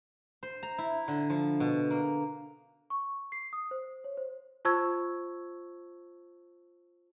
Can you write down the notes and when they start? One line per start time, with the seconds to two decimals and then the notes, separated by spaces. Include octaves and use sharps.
0.43 C5
0.63 A#5
0.78 E4
1.08 D3
1.30 F3
1.60 B2
1.91 A#3
2.90 C#6
3.32 C7
3.53 D#6
3.71 C5
4.04 C#5
4.17 C5
4.65 F4 C5 A5 C#6 E6 G#6